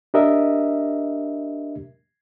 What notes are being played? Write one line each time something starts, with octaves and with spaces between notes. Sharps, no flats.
D4 G4 A#4 D#5 E5